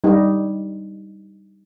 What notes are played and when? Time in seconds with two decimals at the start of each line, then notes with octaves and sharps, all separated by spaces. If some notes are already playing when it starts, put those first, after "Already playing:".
0.04 G3 D#4